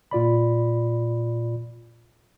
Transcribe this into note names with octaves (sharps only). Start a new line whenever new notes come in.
A#2 F4 D5 B5